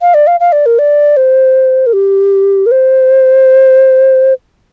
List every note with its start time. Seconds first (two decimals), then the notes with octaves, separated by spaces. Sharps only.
0.01 F5
0.14 D5
0.27 F5
0.40 F5
0.52 D5
0.66 A#4
0.79 D5
1.17 C5
1.86 A#4
1.94 G4
2.66 A#4
2.71 C5